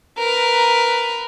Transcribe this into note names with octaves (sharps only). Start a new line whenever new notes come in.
A#4 B4